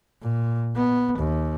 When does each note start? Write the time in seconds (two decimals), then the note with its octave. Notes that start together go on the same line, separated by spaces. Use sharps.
0.22 A#2
0.76 B3
1.18 D#2